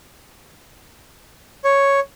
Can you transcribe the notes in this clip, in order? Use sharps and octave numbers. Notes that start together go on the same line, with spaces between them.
C#5